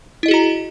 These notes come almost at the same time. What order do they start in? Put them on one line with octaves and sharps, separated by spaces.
E4 D#5 G#4 F#4 A#5